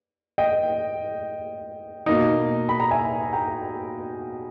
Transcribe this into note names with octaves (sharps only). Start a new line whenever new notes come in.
D#5 G5
B2 A#3 D#4
B5
A#5
E5 G#5
G5 A#5